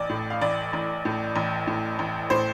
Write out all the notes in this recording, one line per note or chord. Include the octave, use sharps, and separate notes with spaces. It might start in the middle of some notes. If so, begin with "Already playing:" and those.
Already playing: A1 D5
A2
F5
A1 D5
A1
A2
A1
A2
A1
A2 C5